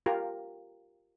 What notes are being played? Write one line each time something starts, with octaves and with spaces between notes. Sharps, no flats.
F4 G4 A#4